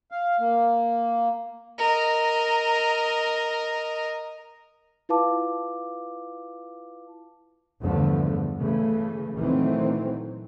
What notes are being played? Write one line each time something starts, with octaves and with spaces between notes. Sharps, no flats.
F5
A#3
A#4 D#5
E4 F4 B4 F5 A5 D6
E2 G2 D3 F3 A3
C#3 E3 A3
A#2 D#3 E3 F#3 A3 C4